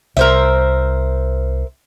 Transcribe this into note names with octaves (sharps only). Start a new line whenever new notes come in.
C2 A#4 C5 E5